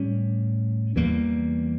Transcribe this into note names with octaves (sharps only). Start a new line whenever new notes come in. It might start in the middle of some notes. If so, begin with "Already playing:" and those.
Already playing: A2 G3 C#4
E2 E3 G3 A#3